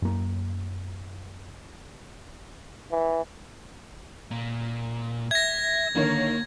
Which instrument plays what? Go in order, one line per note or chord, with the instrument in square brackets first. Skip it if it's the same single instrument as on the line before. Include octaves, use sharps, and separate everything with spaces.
[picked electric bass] F#2 A#3
[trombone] E3
[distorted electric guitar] A#2
[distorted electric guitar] E5 [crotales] G#6 A#6
[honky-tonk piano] D3 D#3 C#5 [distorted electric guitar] A#3